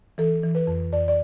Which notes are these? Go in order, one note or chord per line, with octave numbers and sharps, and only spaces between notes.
E3 A4
E3
B4
F2
F2 D5
D5